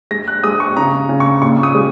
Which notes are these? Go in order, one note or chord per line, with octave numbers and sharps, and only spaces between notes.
G#3 A#6
F#6
G#3 D#6
C#6
C#3 A#5
C#3
C#6
A#2 C#6
D#6
G#3